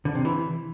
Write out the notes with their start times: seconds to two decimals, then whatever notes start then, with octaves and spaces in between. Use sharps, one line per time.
0.05 D3
0.15 C3
0.25 E3